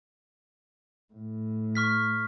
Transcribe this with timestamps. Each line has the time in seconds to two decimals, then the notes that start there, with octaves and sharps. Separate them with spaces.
1.14 A2
1.75 C#6 F6 B6